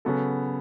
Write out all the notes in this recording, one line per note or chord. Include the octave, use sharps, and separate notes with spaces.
C#3 F#3 B3 F#4 A4